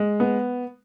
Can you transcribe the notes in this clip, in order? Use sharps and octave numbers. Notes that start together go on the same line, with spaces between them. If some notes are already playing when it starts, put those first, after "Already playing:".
Already playing: G#3
B3